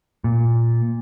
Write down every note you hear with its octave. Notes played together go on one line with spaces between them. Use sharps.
A#2